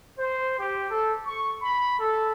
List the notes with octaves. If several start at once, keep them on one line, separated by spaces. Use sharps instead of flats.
C5
G4
A4
C#6
B5
A4